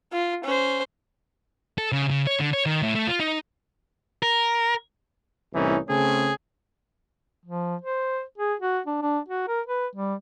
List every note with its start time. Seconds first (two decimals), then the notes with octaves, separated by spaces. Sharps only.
0.13 F4
0.44 C#4 C5
1.78 A4
1.92 C#3
2.09 C#3
2.27 C#5
2.40 D3
2.53 C#5
2.66 D#3
2.83 A2
2.95 A3
3.07 F4
3.20 D#4
4.22 A#4
5.54 C2 A2 E3 C#4 D#4
5.89 C#3 A3 C4 C#4 G#4
7.45 F3
7.82 C5
8.38 G#4
8.60 F#4
8.86 D4
9.02 D4
9.29 F#4
9.48 A#4
9.67 B4
9.95 G3